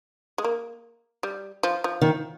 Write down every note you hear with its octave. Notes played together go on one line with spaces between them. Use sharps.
G#3
A#3
G3
F3
F3
D#3